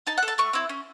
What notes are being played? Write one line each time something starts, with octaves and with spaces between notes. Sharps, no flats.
D#4 A5
F#5
A4
A5
A3 C#6
C4 E4
C#4